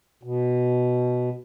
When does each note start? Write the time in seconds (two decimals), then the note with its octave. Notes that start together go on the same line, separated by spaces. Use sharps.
0.23 B2